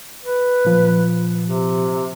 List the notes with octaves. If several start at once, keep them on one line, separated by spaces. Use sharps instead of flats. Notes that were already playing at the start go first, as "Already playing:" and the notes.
B4
A#2 F3
C3